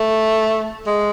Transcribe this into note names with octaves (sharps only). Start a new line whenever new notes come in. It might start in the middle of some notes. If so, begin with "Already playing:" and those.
Already playing: A3
G#3